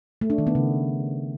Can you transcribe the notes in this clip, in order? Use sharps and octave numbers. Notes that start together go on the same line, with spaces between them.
A3
D4
D#3
B3
C#3